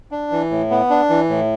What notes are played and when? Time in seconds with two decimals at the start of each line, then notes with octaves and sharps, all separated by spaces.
0.11 D4
0.32 E3
0.51 A2
0.71 B3
0.90 D4
1.10 E3
1.29 A2